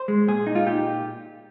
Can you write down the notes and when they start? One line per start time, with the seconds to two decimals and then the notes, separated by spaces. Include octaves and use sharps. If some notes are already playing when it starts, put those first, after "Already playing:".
Already playing: C5
0.08 G#3
0.28 A#2 G#4
0.47 D#4
0.55 F4
0.67 A#2 G4